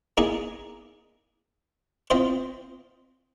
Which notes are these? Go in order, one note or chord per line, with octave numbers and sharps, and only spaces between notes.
A#3 D#4 G#4 D#5
C4 F4 C5 D#5